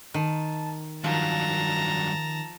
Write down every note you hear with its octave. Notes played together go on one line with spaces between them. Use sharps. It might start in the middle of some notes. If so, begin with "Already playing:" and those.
D#3 A5
G2 D#3 F3 F#3 A5 A#5